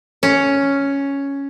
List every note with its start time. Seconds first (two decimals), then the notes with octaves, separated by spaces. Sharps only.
0.23 C#4